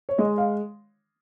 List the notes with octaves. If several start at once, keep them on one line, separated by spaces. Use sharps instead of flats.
C#5
G#3 D#5
F5